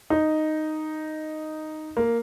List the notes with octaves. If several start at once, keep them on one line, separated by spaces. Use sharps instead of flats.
D#4
A#3